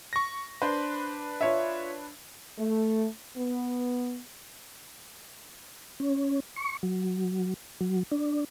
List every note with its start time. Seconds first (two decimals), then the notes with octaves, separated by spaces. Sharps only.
0.13 C#6 A#6
0.62 D4 B4 C5
1.41 F4 C#5 E5
2.58 A3
3.37 B3
6.00 C#4
6.56 C#6
6.83 F#3
7.81 F#3
8.12 D4